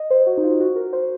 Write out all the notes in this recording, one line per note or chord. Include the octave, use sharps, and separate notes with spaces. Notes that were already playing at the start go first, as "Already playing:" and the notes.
Already playing: D#5
C5
F#4
D#4
F4
F#4
A#4
C5